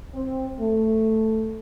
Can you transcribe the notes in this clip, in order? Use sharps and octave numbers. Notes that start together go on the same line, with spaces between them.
C4
A3